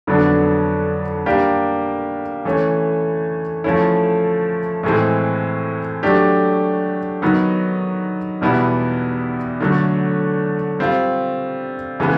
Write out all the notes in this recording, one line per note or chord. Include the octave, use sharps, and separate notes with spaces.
F2 D3 F#3 B3 D4
G3 A#3 D4 G4
E3 A3 C#4
F3 A3 C#4 E4
A2 E3 G#3 C4
F#3 A3 D4 G4
D#3 F#3 B3 D#4
E2 B2 G3 B3 E4
D3 F#3 A3
G3 C4 F4
C#3 E3 G#3 B3